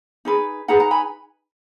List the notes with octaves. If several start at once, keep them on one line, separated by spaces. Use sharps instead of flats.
D#4 G#4 B4
D#4 G#4 B4 F#5 A#5
F#5 A#5
G#5 B5